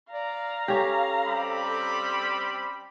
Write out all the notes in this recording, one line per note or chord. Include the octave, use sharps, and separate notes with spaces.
D5 F5 A#5
C#4 G4 A4
G3 C4 B5